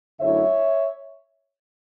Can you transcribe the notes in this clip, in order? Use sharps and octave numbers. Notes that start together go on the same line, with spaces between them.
F#2 D3 A3 E4 C#5 E5